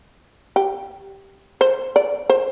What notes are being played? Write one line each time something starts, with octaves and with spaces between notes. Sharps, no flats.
G4
C5
D5
C5